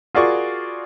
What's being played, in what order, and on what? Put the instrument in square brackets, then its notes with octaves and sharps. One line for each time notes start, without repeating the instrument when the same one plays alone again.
[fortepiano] F4 F#4 G#4 A#4 D5 C#6